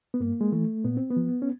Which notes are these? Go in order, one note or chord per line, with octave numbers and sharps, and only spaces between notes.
B3
G2 A#3
G#3
E3 A3
A#2 B3
C4
B3
F3
C#4